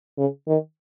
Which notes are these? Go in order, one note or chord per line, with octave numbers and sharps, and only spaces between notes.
C#3
D#3